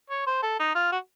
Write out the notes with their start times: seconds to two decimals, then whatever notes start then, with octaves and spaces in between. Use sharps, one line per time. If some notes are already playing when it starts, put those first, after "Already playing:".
0.10 C#5
0.27 C5
0.43 A4
0.59 D#4
0.75 F4
0.92 F#4